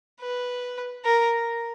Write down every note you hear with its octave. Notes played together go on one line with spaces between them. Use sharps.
B4
A#4